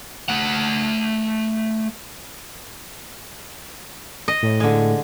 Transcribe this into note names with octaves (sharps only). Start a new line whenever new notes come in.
A3 F#5
D#5
A2
D3 G#3